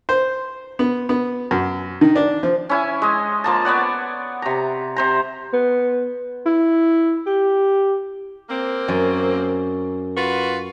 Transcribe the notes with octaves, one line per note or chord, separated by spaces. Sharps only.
C5
B3
B3
F#2
D#3
D4
F3
C#4 E4 G#5
G#3 D#5
F3 A#3 A5
B3 C#5 D5 F#5
C3 A#5
C3 C5 A#5
B3
E4
G4
A#3 C4
F#2
F4 F#4 B4